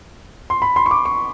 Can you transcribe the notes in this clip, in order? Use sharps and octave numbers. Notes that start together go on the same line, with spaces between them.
C6
B5
C6
C#6
D6
C#6